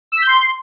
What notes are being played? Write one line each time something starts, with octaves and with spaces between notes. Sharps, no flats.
E6
B6
G6
C6